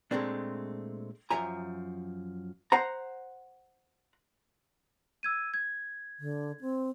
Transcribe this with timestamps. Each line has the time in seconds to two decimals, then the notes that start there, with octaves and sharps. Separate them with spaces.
0.11 A#2 G#3 A3 C4 D4
1.31 F#2 F3 E5 G#5 A#5
2.72 C5 F#5 A#5
5.23 E6 G#6 D#7
5.54 G#6
6.19 D3
6.61 C4